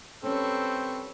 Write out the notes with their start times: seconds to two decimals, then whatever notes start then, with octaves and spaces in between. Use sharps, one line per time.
0.23 G3 C4 C#4 A4 B4 C#6